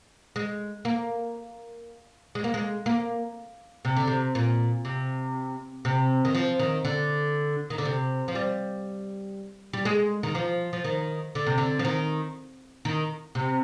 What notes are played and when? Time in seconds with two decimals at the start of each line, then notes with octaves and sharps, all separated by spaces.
0.36 G#3
0.85 A#3
2.35 G#3
2.44 A#3
2.54 G#3
2.86 A#3
3.85 C3
3.97 D3
4.07 C3
4.35 A#2
4.85 C3
5.85 C3
6.25 D#3
6.35 F3
6.59 D#3
6.85 D3
7.70 D#3
7.78 D3
7.85 C3
8.28 F3
8.35 G3
9.73 G3
9.85 G#3
10.23 D#3
10.35 F3
10.73 F3
10.84 D#3
11.35 D3
11.47 C3
11.58 D3
11.79 F3
11.85 D#3
12.85 D#3
13.35 C3